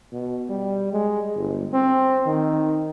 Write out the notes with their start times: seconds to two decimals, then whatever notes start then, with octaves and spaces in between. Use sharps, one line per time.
0.12 B2
0.49 G3
0.92 G#3
1.36 G1
1.73 C4
2.26 D#3